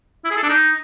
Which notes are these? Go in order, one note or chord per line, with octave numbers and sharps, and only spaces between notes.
E4
G#4
A4
D4
D#4